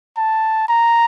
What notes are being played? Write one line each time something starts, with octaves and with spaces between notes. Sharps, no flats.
A5
A#5